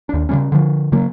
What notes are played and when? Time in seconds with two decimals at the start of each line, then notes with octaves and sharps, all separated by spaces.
0.09 D#2 D4
0.29 C#3 E3 G3 C#4
0.52 D3 F3
0.92 C#3 F#3 A#3